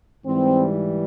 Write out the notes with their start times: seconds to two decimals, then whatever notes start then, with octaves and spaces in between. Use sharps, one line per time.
0.25 G#2 E3 G3 C4